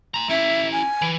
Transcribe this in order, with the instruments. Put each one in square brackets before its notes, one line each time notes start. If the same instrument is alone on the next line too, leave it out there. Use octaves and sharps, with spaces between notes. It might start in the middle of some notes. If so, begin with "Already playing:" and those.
[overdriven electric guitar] A#5 C6
[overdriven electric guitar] C#4 E4 [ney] E5
[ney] G#5
[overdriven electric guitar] E3